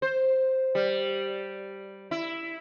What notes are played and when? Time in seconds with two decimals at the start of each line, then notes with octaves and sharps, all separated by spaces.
0.02 C5
0.75 G3
2.11 E4